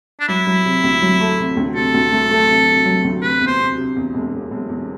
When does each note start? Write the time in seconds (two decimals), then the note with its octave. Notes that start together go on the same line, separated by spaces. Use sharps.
0.20 D4
0.28 F#3 E4
0.47 F#3
0.65 C3
0.84 D2
1.02 F#3
1.20 A3
1.38 C3
1.57 D2
1.75 C3 A4
1.94 D2
2.12 A3
2.30 A3
2.49 C3
2.67 C3
2.86 F#3
3.04 D2
3.22 C3 B4
3.41 E2
3.47 C5
3.59 C3
3.77 C3
3.96 E2
4.14 E1
4.33 E1
4.51 E1
4.69 E2